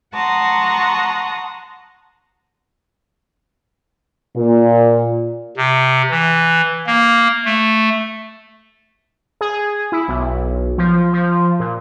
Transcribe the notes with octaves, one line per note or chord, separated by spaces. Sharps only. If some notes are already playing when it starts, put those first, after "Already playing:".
F#5 A5 A#5 C6 C#6 D#6
A#2
C3
E3
A#3
A3
G#4
E4
B1
F3
F3
A#2